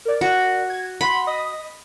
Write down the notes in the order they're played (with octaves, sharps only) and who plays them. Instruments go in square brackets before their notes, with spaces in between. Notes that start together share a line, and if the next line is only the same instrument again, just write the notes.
[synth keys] A#4 D5
[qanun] F#4
[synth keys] G#6
[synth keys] F#5 C6 [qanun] B5
[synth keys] D#5 D#6